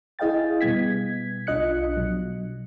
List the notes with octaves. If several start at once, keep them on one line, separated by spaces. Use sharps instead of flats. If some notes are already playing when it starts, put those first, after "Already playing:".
E4 G#4 D#5 F5 G5 A6
B2 G3 B3 G#6 B6
B1 D4 F4 D#5 F#6 C#7
B2 F#3